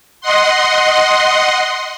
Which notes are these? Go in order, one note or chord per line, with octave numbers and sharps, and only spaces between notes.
D#5 F#5 C6